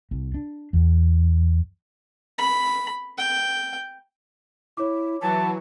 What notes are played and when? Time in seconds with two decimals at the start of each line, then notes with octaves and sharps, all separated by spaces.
0.11 C2
0.34 D4
0.73 E2
2.38 B5
3.18 G5
4.77 E4 C#5 D6
5.21 E3 F#3 A5